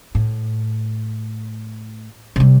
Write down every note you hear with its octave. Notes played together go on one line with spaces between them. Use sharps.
A2
C3 G3